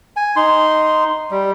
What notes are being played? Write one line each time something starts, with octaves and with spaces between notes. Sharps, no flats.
G#5
D#4 C6
G3